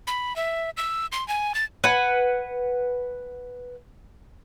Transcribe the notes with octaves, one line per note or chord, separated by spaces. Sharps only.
B5
E5
E6
C6
G#5
A6
B4 F#5 G#5